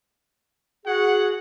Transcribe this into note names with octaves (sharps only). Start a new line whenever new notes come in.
F#4 G#4 F#5